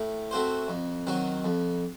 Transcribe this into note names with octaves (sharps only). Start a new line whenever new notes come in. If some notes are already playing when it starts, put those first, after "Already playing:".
Already playing: A2
A3 C4 F#4 C5
F2
D#3 F#3 C4
F2